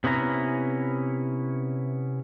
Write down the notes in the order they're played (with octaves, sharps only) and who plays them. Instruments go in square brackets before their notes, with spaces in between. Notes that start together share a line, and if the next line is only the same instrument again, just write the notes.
[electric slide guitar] C3 B3 C#4 E4 A#5